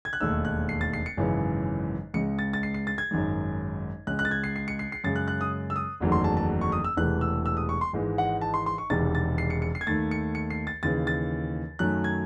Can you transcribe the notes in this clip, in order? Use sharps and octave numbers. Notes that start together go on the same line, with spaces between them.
G#6
F#6
E1 D#2 D#3 A3 E6
F#6
C7
A6
C7
C#7
G#1 F#2 C#3 E3 G#3
C#2 C#3 G#3 C#7
A6
A6
C7
C7
A6
G#6
G#1 F#2 D#3 G#3
C#2 C#3 G#3 F#6
F#6
A6
G#6
C7
C7
C#7
C7
C7
F#2 C#3 G#3 A6
F#6
F#6
D#6
E6
D#6
F#1 E2 D#3 F#3 A3
C6
A5
A5
C#6
D#6
E6
E1 E2 C3 E3 A3 F#6
E6
E6
D#6
C#6
C6
G#1 G#2 E3 G#3
F#5
A5
C6
C6
C#6
E1 E2 C3 D#3 A6
A6
C7
C#7
C#7
C7
G#6
D#2 D#3 A3 A6
C#7
C#7
C7
A6
D#2 C#3 E3 A6
A6
F#2 D#3 F#3 A3 F#6
G#6